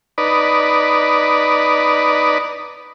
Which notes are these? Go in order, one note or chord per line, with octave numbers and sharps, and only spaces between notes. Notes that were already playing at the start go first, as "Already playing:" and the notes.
D#4 B4 D5